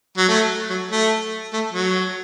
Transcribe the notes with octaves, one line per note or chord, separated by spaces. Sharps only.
F#3
A3
F#3
A3
A3
F#3